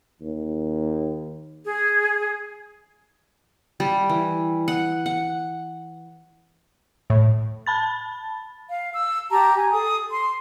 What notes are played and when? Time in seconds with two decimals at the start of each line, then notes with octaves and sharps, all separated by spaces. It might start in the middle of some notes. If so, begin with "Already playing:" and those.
0.21 D#2
1.64 G#4
3.80 G3
4.09 E3
4.68 F#5
5.06 F#5
7.10 A2
7.66 A5 B5 A6
8.69 F5
8.93 E6
9.30 G4 A5 A#5
9.56 G#5
9.71 A4 D#6
10.11 C6